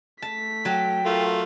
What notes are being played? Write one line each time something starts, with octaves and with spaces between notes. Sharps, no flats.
A3 A5 B6
F#3 G5 A5
A3 F4 A#4